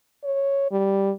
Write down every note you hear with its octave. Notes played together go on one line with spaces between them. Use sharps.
C#5
G3